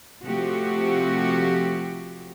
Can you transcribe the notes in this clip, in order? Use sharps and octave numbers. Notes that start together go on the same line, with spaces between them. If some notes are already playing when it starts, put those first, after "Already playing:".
C3 F3 A3 F#4 G4